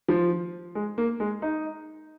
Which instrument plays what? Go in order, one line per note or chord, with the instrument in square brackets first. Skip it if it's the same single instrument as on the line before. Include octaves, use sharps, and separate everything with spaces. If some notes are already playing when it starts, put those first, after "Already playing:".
[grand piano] F3
G#3
A#3
G#3
D#4